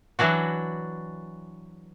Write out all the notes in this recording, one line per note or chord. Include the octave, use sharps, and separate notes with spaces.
E3 F#3 D4 F#4